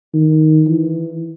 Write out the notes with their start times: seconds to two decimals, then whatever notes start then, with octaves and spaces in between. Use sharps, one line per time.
0.14 D#3
0.67 E3